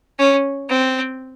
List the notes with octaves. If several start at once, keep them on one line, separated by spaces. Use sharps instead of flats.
C#4
C4